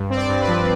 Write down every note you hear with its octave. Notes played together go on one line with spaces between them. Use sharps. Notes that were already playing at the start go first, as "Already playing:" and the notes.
Already playing: G2
C4
D5
G2
B4
F3